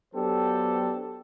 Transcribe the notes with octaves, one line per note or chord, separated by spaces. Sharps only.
F#3 B3 D4 G4 A4 C5